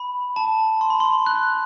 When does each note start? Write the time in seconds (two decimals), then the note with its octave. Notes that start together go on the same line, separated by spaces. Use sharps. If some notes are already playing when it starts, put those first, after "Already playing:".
Already playing: B5
0.36 A5
0.81 C6
0.90 B5
1.00 C6
1.26 F#6